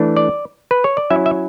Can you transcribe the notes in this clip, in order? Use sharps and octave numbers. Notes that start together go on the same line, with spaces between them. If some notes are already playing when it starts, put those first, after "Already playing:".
Already playing: E3 A3 D4
D5
B4
C#5
D5
F#3 C#4 E4 E5
E5